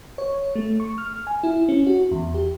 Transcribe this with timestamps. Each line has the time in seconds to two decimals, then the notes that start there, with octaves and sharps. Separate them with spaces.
0.18 C#5
0.55 A3
0.80 C#6
0.98 F6
1.27 G#5
1.43 E4
1.69 C#4
1.87 F#4
2.11 E2
2.34 G4